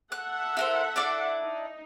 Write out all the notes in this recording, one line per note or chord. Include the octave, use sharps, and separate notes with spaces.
A4 E5 F#5 F#6
E4 A#4 C5
D4 E4 D5
D#4